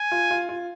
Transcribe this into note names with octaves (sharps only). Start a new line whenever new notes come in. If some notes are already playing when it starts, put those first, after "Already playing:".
Already playing: G#5
F4
F4
F4